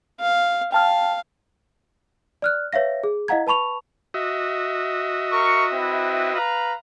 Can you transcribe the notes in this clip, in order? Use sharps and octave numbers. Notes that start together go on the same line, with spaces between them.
F5
F5 G5 A5 F6
D5 F6 F#6
B4 C#5 E5 F5 A#6
G#4
E4 D#5 F5 F#5 A#5 G#6
B4 A5 B5 C#6 F7
F#4 D#5 E5
A#4 C#6
C4 E4 B4
B4 F5 A#5